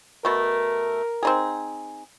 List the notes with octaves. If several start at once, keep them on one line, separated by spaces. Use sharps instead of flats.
B2 A3 A#4
C4 D#4 G#4